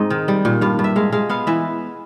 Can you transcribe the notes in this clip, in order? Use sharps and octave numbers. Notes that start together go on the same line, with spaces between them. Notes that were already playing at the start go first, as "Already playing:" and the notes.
Already playing: G#2 C4 D#4 D#5
D#3
G3
A#2
G2 F5
G2
E5
G#3 F5
G#3 F5
B3 F5
E3 E5